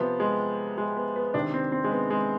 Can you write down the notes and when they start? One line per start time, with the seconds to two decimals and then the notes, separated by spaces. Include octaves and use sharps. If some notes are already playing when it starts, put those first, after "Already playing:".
Already playing: C3 F3 B3
0.20 G#3
0.78 G#3
0.97 B3
1.16 B3
1.34 C3 D#3 D4
1.54 C4
1.72 C4
1.84 G#3
1.91 B3
2.10 G#3